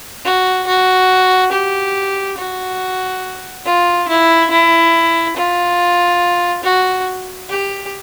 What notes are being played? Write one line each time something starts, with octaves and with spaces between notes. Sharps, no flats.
F#4
F#4
G4
F#4
F4
E4
E4
F4
F#4
G4